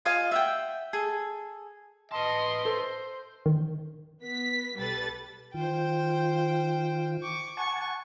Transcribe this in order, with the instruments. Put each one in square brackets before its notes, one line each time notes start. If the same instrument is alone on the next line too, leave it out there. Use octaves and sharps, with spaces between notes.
[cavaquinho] F4 D#5 F5 G#5
E5 F#5 G5
G#4 A4
[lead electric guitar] B4 A5 [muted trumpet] D#5 [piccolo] C6
[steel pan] A4 [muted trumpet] C5
[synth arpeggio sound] D#3
[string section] B3 B6
B1 G3 A4 B4 A6
[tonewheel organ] D#3 F4 [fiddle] C5 G5
[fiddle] C#6 D6
[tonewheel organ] F#5 G#5 A5 [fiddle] C#6